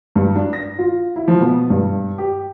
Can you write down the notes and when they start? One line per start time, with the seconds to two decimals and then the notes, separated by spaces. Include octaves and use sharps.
0.16 G2
0.35 D4
0.53 A#6
0.79 F4
1.16 E4
1.28 F3
1.41 B2
1.70 G2
2.18 G4